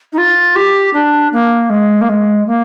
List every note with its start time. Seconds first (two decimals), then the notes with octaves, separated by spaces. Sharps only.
0.12 D#4
0.17 F4
0.55 G4
0.93 D4
1.32 A#3
1.69 G#3
2.01 A#3
2.09 G#3
2.47 A#3